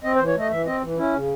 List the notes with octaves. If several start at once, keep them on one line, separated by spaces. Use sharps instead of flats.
C4 D#5
C5
E3
C#5
A3 D#5
E3 E5
C4 D#5
E3
C#4 E4
C#3